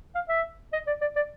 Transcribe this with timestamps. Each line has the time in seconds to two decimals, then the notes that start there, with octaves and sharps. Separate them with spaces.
0.15 F5
0.29 E5
0.73 D#5
0.87 D5
1.01 D5
1.16 D5